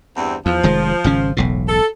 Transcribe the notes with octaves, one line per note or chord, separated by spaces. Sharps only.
E2 G2 C4
E2 F3
F1 D#3 G#3
G#1 C#3 C#4
E1 B1 A2
A4